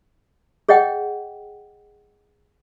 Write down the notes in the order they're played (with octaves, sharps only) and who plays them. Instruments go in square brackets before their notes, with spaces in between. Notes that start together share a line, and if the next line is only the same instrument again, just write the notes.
[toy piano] G#4 C#5 D#5 F#5 G5